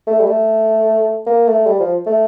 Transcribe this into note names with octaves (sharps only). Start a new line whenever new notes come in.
A3
G3
A3
A#3
A3
G3
F3
A3